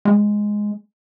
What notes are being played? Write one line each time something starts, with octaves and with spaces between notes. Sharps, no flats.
G#3